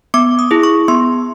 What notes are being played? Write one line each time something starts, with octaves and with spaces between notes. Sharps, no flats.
B3 D6
D#6
E4 G#4
C#6
B3 C6